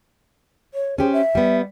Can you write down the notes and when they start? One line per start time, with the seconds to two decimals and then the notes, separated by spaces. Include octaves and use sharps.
0.74 C#5
0.98 C#4 G4 G#4 C5
1.13 E5
1.35 G3 B3